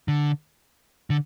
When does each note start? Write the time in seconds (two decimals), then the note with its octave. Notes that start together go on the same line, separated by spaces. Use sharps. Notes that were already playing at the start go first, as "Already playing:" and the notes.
0.08 D3
1.10 D3